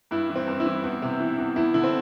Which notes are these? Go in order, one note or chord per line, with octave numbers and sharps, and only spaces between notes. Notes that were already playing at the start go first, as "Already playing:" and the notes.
G2 E4
E3
C4
G2
E4
E3
E2
C3
E3
E2
E2 E4
D3 E4
C4